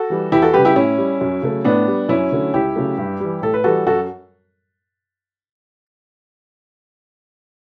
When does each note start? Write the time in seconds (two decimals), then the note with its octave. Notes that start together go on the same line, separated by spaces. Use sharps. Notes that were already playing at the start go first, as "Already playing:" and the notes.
Already playing: F#4 A4
0.10 E3 G3
0.32 E2 E4 G4
0.42 F#4 A4
0.54 C#3 G3 G4 B4
0.65 E4 G4
0.76 A2 C#4 E4
0.98 G3
1.21 F#2
1.42 C#3 F#3 A3
1.64 A2 B3 D4
1.87 G3
2.09 F#2 C#4 E4
2.32 D3 F#3 A3
2.54 C#2 E4 G4
2.76 C#3 F#3 A3
2.98 G2
3.20 E3 G3
3.42 A2 A4
3.54 B4
3.64 E3 G3 F#4 A4
3.87 F#2 F#4 A4